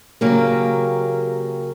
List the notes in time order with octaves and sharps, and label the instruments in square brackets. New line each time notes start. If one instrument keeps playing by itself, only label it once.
[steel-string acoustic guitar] C#3 F#3 A#3 G4